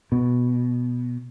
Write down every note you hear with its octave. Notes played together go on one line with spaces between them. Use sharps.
B2